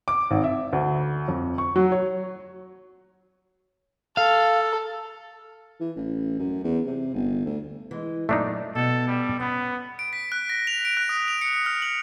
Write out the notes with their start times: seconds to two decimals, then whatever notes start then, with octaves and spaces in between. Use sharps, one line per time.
0.08 D6
0.31 G#1
0.44 E5
0.73 D2
1.28 F2
1.58 C#6
1.76 F#3
1.92 C#5
4.17 A4 F5
5.80 E3
5.96 A1
6.39 F#2
6.64 E2
6.86 C3
7.14 G1
7.46 D2
7.91 E3 G#3
8.29 F#2 A#2 A3 D4 D#4
8.75 B2 A4
9.08 G3
9.40 B3 C#4
9.99 D7
10.13 B6
10.32 F#6
10.50 A#6
10.67 F7
10.85 D7
10.97 F#6
11.09 D#6
11.28 F7
11.41 C#7
11.66 F6
11.82 F#7